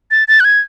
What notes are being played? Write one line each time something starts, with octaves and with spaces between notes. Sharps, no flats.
A6
A6
F#6
G#6